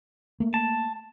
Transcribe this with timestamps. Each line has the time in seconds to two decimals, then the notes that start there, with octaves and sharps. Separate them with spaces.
0.40 A3 A#3
0.54 A5